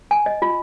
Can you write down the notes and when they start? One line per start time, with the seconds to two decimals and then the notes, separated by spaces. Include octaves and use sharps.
0.11 G#5
0.26 D#5
0.42 F4